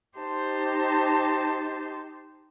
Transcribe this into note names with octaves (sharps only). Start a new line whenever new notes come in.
D#4 G4 C5 A5